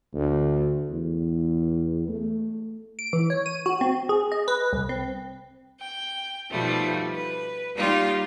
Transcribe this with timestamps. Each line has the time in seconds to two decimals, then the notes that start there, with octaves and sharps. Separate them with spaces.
0.14 D2
0.90 E2
2.08 A3
2.99 D7
3.13 E3
3.30 C#5
3.46 D#7
3.66 F#4
3.81 C4
4.09 G#4
4.32 D#5
4.48 B4
4.73 C2
4.89 C4
5.80 G5
6.50 B2 D#3 F3 G3 A3
7.14 B4
7.75 G3 A#3 D#4 F4 G4